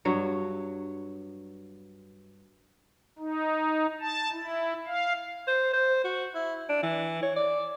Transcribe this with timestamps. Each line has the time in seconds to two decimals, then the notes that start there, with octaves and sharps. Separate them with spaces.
0.05 G2 F#3 C#5
3.19 D#4
4.00 A5
4.33 E4
4.87 F5
5.48 C5
5.74 C5
6.04 F#4
6.34 E4
6.69 D4
6.83 E3
7.22 C#5
7.36 D5